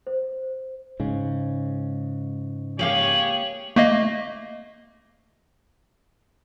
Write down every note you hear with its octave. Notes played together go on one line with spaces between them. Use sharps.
C5
G#2 C#3
A#3 G4 G#4 C#5 F5 G5 F#7
A3 A#3 D#5